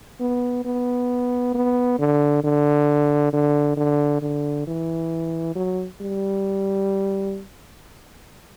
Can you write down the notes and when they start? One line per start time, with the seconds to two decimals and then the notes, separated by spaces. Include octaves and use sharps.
0.21 B3
0.65 B3
1.55 B3
1.99 D3
2.44 D3
3.33 D3
3.77 D3
4.22 D3
4.67 E3
5.55 F#3
6.01 G3